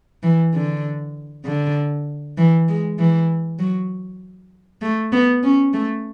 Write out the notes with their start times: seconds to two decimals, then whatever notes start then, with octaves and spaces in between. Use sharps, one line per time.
0.23 E3
0.54 D3
1.45 D3
2.37 E3
2.68 G#3
2.99 E3
3.59 F#3
4.82 A3
5.12 B3
5.43 C#4
5.73 A3